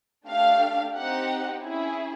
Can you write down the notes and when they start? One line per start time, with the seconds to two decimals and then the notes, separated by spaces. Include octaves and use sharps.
0.28 A3 D4 G4 F5
0.95 C4 D#4 G4 F#5
1.62 C#4 E4 G#4